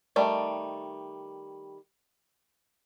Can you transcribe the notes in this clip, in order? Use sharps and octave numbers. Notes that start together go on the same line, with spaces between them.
D#3 G3 A3 D5